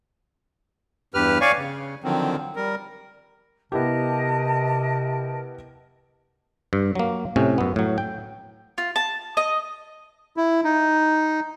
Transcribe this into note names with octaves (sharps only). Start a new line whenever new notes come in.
E2 G2 G4 B4 F6
C#5 D5 F5 G#5 C#6
C#3
D3 D#3 F3 F#3 C4
G3 A#4
C3 B3 E4 G4 A#4 D#5 A5
G2
F#3 A#3
A2 C3 C#4
F#2 B3
A2 F#3
G5
F4
A5
D#5
E4
D#4